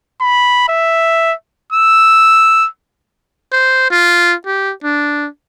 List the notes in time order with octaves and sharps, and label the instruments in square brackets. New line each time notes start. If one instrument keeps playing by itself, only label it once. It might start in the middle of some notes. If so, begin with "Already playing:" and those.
[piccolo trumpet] B5
E5
E6
[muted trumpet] C5
F4
G4
D4